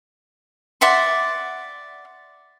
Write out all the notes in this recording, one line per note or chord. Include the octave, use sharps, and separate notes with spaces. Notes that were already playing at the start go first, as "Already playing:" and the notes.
D5 E5 F#5 C6